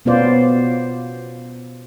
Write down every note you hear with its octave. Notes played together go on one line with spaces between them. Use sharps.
B2 B3 C#4 F4 C5 D5